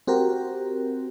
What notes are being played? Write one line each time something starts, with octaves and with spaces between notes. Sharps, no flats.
C4 F#4 G4 A#4